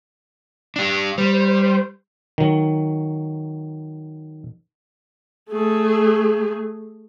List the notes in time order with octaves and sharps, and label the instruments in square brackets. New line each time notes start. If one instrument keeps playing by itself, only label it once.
[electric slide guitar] D4 G4
[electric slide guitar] G3 [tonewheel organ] C5
[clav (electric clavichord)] D#3 F#3
[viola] A3 G#4